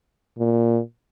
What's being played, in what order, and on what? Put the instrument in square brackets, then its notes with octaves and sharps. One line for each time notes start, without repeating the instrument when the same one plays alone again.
[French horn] A#2